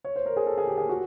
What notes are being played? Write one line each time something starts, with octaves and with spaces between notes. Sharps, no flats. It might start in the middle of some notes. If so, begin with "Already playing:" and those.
C#5
C5
A#4
G#4
A4
G#4
G4
G#4
F#4